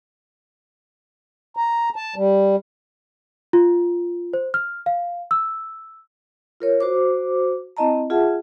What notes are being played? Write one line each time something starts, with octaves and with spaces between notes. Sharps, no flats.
A#5
A5
G3
F4
C5
F6
F5
E6
F4 A#4 C#5
F#4 C5 D6
C4 E4 D#5 A5 A#5
F4 G#4 E5 F#5 A5